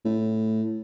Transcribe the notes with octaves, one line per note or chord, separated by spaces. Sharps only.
A2